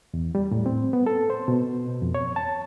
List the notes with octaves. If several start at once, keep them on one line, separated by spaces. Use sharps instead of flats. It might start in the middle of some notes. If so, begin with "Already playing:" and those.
E2
G3
A2
C4
B3
A4
C5
B2
F2
C#5
A5